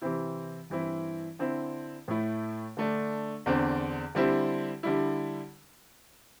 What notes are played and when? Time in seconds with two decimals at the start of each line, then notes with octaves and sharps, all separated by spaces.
0.01 C3 E3 C4 E4
0.70 G2 E3 C4 E4
1.39 D3 C4 E4
2.08 A2 A3 E4
2.77 D3 A3 D4
3.46 E2 D3 C4
4.15 D3 G3 C4 E4
4.83 D3 G3 E4